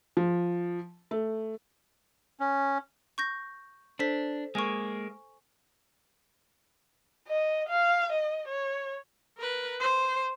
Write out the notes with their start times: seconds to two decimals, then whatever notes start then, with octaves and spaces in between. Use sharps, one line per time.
0.17 F3
1.11 A3
2.40 C#4
3.18 C#6 G6 A#6
3.99 D4 A4 C5 B6
4.55 G#3 A#3 G#5 C#6
7.28 D#5
7.69 F5
8.12 D#5
8.48 C#5
9.38 A#4 B4
9.80 C5